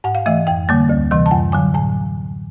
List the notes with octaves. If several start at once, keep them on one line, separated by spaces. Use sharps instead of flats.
G#2 F#5
F5
E3 A3 E5
F2 G5
D3 G3 A#3
D2
C3 E3 G3
A5
F#2 G#5
D3 F#3 G#5
A2 G#5